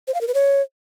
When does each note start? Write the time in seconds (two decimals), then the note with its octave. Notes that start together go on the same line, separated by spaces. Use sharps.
0.08 C5
0.14 F5
0.21 A#4
0.28 B4
0.34 C#5